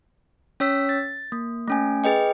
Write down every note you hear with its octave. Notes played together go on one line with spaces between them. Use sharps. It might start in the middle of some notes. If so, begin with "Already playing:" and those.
C#4 C#5 E6 B6
A6
A#3
A3 C#4 G#5
G#4 B4 D#5 G5